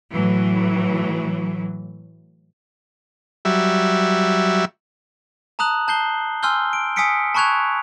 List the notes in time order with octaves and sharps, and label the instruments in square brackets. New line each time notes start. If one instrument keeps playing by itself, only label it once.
[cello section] A2 E3 F#3
[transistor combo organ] F#3 G3 E5
[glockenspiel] A5 A#5 D#6 F#6 F#7
A5 G6 C7 G7
G#5 C6 E6 F6 G6 G7
D7
G#5 D#6 E6 B6 C#7 D7
A5 B5 C#6 F#6 G#6 F7